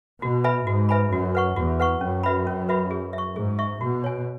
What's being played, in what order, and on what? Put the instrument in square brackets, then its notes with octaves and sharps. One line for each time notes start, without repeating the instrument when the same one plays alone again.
[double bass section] B2 [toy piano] F#4
[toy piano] B4 E5 G#5 B5
[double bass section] G#2 [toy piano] F#4
[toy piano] B4 E5 G#5 B5
[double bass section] F#2 [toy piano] F#4
[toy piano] B4 F#5 C#6
[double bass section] E2 [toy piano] F#4
[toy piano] B4 F#5 C#6
[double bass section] F#2 [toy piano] C#4
[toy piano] F#4 B4 E5 B5
C#4
F#4 B4 E5 B5
G#4
E5
C#6
[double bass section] G#2 [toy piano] G#4
[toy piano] E5 C#6
[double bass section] B2 [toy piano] F#4
[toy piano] C#5 G#5